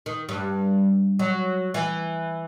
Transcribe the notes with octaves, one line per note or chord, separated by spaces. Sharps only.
D#3
G2
F#3
E3